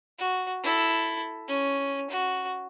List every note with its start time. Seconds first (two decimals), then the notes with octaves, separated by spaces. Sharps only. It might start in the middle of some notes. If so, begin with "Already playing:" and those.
0.19 F#4
0.63 E4 A4
1.48 C#4
2.10 F#4